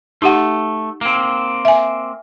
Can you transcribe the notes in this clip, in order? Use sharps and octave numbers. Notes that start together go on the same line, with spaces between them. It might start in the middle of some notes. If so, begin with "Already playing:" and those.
A3 D#4 G4 F#5
A#3 C4
E5 G#5